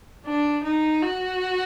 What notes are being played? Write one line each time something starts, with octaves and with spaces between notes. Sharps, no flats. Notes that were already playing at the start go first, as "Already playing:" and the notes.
D4
D#4
F#4